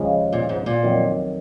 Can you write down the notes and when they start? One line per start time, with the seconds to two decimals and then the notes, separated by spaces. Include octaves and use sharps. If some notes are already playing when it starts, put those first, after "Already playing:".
Already playing: D#2 C#3 F3 G#3
0.33 A#2
0.49 G#2
0.66 A#2
0.83 F2 D#3 F#3